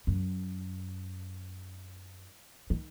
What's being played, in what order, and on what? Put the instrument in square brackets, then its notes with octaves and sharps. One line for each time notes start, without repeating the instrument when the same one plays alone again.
[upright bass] F#2
D#3